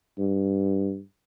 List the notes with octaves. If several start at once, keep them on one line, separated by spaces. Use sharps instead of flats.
G2